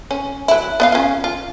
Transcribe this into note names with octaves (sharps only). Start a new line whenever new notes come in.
C#4
F#3 E4
B3 D#5 F5
C#4 F4
F4